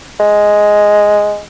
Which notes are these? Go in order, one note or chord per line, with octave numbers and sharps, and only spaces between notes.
G#3